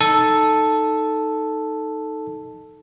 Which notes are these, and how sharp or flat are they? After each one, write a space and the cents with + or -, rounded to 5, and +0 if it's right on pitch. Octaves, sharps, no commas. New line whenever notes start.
D#4 +0 A4 +0